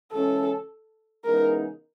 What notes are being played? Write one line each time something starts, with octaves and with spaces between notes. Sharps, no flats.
C#3 E3 G#3 C#4 A4
C#3 E3 G#3 B3 D#4 A#4